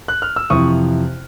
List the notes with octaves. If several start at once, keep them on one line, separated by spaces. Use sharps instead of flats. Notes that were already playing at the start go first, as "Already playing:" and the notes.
F#6
F6
E6
F2 C3 E3 C#6 D#6